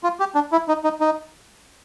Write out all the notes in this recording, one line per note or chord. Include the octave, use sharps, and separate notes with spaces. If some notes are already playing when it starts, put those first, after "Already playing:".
F4
G4
D4
E4
D#4
D#4
D#4